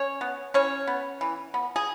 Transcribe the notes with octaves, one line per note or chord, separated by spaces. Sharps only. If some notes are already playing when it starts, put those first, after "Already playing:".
Already playing: C#4 C#5
B3
E3 C#4 C#5
B3
E3
B3
G#4